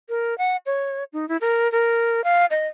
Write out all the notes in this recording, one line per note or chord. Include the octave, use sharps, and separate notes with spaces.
A#4
F#5
C#5
D#4
E4
A#4
A#4
F5
D#5